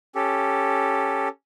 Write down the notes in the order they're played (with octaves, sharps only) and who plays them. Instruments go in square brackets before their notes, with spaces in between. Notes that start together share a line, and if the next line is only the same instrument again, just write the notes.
[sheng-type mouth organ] C#4 G4 A4